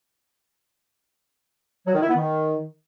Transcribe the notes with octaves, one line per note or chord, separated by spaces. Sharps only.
F#3
D#3
E4
B3
D#3